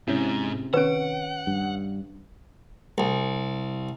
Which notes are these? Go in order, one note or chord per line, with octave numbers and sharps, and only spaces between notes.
G#2 C3 C#4 E4
D#3 C#4 B4 C#5 F#5 D7
G2
C2